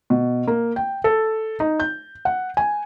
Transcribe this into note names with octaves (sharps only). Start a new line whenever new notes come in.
B2
A#3
G5
A4
D#4
G6
F#5
G#5